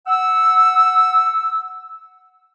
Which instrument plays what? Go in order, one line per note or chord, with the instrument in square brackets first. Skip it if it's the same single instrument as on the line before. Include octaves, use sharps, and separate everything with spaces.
[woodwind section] F#5 E6